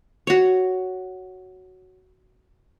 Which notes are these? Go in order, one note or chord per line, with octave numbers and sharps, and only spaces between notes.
F#4 C#5